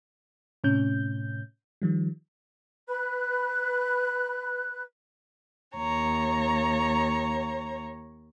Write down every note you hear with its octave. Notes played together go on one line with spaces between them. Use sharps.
A2 C3 C#4 G6
D#3 F3 G3
B4 B5 F#6
D#2 C#5 A#5